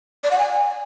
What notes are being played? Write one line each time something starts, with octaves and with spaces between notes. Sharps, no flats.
D5
F#5
G#5